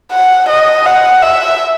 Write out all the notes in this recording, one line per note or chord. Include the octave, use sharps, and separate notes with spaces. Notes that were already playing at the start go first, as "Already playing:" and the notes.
F#5
D#5
F#5
E5